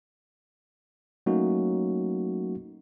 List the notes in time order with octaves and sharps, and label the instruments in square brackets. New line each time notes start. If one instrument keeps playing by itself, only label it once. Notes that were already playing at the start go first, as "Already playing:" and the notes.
[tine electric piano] F#3 A3 A#3 C#4 D#4 F#4